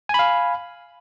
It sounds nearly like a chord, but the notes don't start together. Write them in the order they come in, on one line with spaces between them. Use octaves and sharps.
G#5 B5 F5